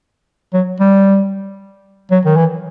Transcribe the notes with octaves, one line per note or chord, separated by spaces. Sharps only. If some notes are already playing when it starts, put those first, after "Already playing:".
F#3
G3
F#3
D#3
E3